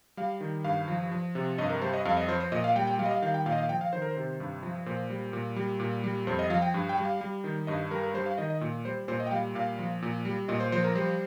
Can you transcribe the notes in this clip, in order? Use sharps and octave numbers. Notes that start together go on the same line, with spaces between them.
G3 F5
D#3
G2 F5
F3
F3
C3
G2 D#5
A#4
G3 C5
D#5
F2 F5
D#5
F3 C5
C5
A#2 D#5
F5
G3 G5
G5
G3 F5
D#5
F5
D#3 F5
G5
A#2 F5
D#5
F5
F3 G5
F5
D#3 C5
A#4
C5
C3
G2
F3
A#2 C5
G3
A#2
G3
A#2
G3
F2 C5
D#5
F3 F5
G5
G2
G5
G3
F5
G3
D#3
G2 D#5
G3 A#4
A#4
G3 C5
F5
D#3 D#5
D#5
A#2
G3 C5
A#2 C5
D#5
G5
G3 F5
A#2 F5
F3
A#2
G3
A#2 D#5
C5
F3 C5
A#4
G3 C5